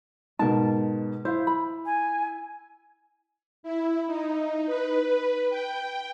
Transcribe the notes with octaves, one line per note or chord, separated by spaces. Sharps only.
G#2 B2 A#4 A5
E4 C5 F5
B5
G#5
E4
D#4
B4
G5